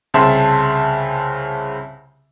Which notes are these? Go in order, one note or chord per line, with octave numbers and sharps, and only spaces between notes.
C2 C#3 C4 E5 A5 C6